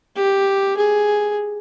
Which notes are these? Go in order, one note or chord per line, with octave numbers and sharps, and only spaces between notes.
G4
G#4